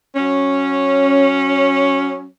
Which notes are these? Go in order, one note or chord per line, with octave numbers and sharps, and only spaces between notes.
F#3 C#4